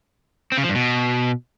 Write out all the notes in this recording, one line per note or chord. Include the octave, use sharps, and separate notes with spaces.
C4
C#3
F3
G2
B2